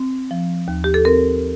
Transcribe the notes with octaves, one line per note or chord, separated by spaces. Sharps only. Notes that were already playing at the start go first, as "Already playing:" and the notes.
Already playing: C4
F3
D#2
G4
A4
C4 A#4